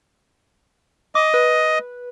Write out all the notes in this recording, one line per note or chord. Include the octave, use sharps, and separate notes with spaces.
D#5 D6
B4